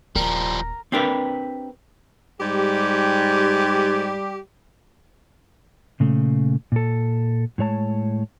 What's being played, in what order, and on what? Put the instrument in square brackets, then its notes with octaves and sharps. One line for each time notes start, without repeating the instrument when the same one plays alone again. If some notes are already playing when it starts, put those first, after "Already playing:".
[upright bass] D#1 [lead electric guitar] F3 G3 [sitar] A#4
[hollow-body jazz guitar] C4 D4 G4 A#4 B4
[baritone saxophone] G#2 [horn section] G3 G4
[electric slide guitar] A#2 C#3 A3
A#2 A4
A2 G#3 C#5 A5